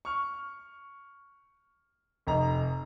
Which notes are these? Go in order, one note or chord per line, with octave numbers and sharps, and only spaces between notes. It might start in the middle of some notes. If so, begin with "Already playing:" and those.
C#6 F6
F1 D#5 A#5